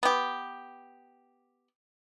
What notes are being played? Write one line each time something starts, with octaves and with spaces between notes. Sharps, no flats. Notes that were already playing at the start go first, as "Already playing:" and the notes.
B3 G4